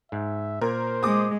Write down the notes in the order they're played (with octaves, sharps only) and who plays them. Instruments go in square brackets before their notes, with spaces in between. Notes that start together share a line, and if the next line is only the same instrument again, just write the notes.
[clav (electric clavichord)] G#2 [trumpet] E5
[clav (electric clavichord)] A#2 [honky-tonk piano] A#4 [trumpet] C5
[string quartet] G#3 [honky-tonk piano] D6 D#6